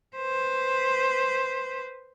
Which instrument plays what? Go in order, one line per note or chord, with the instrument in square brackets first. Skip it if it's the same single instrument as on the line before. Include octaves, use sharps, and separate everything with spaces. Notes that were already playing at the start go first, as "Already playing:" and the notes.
[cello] B4 C5